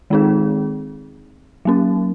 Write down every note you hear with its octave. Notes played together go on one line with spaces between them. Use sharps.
D#3 G#3 C4 D#4 G#4
F#3 A#3 C#4